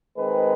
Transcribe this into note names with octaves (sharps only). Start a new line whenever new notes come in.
D#3 G#3 C4 B4